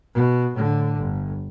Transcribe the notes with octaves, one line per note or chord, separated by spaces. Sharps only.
B2
A2 D3
G1